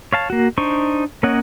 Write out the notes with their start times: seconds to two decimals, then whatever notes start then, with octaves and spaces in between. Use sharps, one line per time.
0.13 C#5 F5 A5
0.30 A#3 F#4
0.58 D4 D#4 C5 C#6
1.23 A#3 C#4 C#5 D#5 F#5